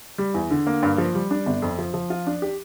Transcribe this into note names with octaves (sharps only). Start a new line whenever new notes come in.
G3
E2
D3
A#3
G2
F3
G3
D4
G1
F2
F3
F3
F4
D4
G4